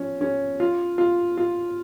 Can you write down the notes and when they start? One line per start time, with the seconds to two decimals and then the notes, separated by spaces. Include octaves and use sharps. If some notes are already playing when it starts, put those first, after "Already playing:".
Already playing: F3 C#4
0.21 C#4
0.60 F4
0.98 F4
1.37 F4